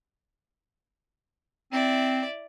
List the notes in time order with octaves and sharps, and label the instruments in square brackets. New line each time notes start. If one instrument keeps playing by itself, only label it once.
[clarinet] C4 [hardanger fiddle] E4 D5